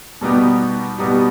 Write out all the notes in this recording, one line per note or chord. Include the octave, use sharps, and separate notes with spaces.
B2 G3 B3 D#4 G4
B2 G3 B3 D#4 G4